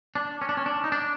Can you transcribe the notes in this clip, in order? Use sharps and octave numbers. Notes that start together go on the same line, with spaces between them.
D4
C#4
D4
C#4
D4
D#4
D4